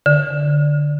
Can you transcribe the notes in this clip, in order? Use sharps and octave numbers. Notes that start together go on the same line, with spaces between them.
D3